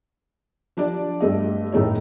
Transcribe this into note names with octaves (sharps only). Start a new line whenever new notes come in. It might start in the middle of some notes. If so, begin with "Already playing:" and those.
F3 D4 G4 D5
G2 A3 D#5
A2 D#3 A3 D#4 C#5